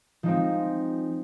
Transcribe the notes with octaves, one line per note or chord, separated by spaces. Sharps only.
F3 G#3 C4 D#4